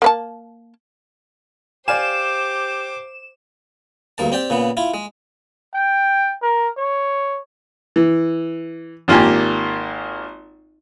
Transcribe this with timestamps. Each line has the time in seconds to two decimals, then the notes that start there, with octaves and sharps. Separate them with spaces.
0.02 A#3 B4 A5
1.88 G4 C5 D5 F5 G#5 D6 E7
4.18 D2 G2 A#3 A5
4.32 C4 G4 D5 G5
4.50 A#2 C#3 B3
4.77 E4 F4
4.94 G#3
5.74 G5
6.42 A#4
6.77 C#5
7.96 E3
9.08 G#1 A#3 F4 G4 G#5